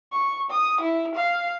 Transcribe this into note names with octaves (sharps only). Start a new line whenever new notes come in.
C#6
D#6
E4
F5